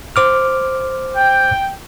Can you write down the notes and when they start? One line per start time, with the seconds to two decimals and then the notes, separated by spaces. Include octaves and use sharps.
0.16 C5 D6 F6
1.17 G5